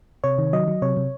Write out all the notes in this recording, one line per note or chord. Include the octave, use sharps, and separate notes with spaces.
C3 C#5
D#3
F#3 D#5
F#3
C3 C#5
C3